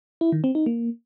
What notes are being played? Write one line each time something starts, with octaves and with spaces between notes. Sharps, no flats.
E4
D#3
C4
D#4
A#3